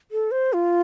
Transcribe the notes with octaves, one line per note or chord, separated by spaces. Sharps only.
A4
C5
F4